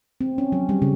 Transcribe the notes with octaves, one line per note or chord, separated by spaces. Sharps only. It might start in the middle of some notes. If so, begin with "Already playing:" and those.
C4
C#4
F#3
G3
C#3